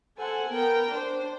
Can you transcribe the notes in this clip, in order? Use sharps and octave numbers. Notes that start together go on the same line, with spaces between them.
A4 C5 F#5 G#5
B3 A#4 G5
D4 C5